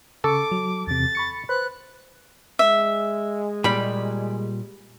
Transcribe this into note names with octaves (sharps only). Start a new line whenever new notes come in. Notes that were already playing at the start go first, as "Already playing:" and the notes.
C#3 A4 C#6 D6 C#7
F#3
E2 C3 A6
B5 C#6 C#7
B4 C5 B5 F#6
G#3 E5
A#2 G3 B5